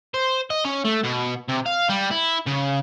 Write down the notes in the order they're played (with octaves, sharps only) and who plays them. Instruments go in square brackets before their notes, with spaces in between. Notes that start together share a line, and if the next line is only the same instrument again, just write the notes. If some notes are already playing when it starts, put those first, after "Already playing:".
[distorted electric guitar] C5
D#5
C#4
A3
B2
C3
F5
G3
E4
C#3